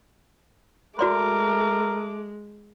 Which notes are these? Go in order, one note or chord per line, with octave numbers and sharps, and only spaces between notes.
G#3 A3 F#4 A#4 D5 C6 D6